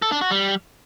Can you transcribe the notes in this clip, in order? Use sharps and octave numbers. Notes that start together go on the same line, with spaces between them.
A4
D4
F#4
G3